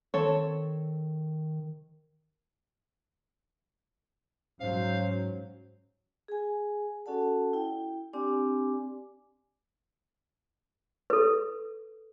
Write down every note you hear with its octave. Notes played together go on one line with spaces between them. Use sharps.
D#3 C4 A4 C#5
G#2 F#3 C#4 C5 F5
G#4 G#5
C#4 F#4 A4 D5 F#5 A5
E4 G5
C4 D4 G4 D5 G#5 D6
A4 B4